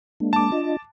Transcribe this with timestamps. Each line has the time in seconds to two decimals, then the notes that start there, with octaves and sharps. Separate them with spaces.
0.20 G#3 A#3 D4
0.33 A5 D6
0.52 D4 F4 D#5